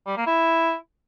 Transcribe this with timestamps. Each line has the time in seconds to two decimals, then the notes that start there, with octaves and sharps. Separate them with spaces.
0.07 G3
0.17 A#3
0.27 E4